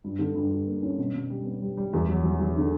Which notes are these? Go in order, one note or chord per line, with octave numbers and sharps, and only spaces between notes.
G2
D3
G2
G2
A#3
C#4
B2
B2
G3
B3
G3
G3
E2
F#3
F#3
F#3
D3